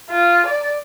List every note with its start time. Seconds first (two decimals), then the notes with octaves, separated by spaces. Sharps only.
0.10 F4
0.47 D5